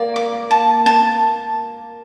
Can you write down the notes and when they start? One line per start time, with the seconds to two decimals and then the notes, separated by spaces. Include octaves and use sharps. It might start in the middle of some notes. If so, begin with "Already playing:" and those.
Already playing: A#3 D5
0.16 D6
0.51 A5
0.86 A5